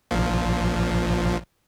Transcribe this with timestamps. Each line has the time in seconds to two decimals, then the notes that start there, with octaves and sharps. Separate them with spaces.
0.11 A#1 A#2 F3